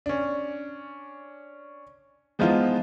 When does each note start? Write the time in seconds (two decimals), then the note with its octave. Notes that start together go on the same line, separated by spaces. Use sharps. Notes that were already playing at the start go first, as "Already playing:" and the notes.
0.06 C#4 D4
2.39 E3 F3 G#3 B3 D#4 F4